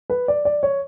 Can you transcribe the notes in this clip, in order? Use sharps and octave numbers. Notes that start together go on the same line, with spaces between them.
B4
D5
D5
C#5